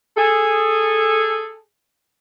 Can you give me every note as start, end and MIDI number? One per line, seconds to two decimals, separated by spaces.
0.18 1.56 68
0.18 1.56 69